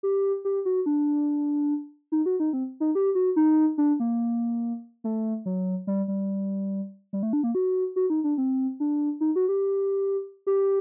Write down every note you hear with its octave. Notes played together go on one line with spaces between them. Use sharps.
G4
G4
F#4
D4
D#4
F#4
D#4
C4
D#4
G4
F#4
D#4
D4
A#3
A3
F#3
G3
G3
G3
A3
D4
A#3
F#4
F#4
D#4
D4
C4
D4
D#4
F#4
G4
G4